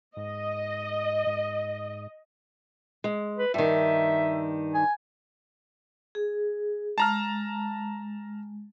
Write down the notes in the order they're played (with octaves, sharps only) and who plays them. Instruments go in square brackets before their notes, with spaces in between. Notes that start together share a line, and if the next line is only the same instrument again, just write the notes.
[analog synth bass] G#2 [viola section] D#5
[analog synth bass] G#2
[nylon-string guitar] G#3
[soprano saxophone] B4
[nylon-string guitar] G2 D#3 [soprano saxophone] E5
[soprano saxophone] G#5
[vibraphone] G#4
[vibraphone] G#3 [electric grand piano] A5 A#5 F6